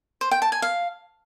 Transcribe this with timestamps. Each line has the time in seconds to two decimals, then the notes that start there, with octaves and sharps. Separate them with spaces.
0.21 C5
0.31 G5
0.42 A5
0.52 G#5
0.62 F5